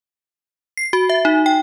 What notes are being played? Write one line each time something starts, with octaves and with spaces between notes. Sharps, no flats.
C7
F#4
E5
D#4
G5